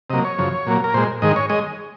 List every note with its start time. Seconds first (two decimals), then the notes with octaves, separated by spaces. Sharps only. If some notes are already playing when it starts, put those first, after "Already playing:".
0.10 C3 F#3 A#3 D#5
0.25 C#5
0.38 F#2 C#3 F3
0.67 A#2 F#3 A#3
0.84 A#4
0.94 A#2 G#3 C5
1.22 G#2 D#3 G#3 D#5
1.36 C#5
1.50 G#3 D#5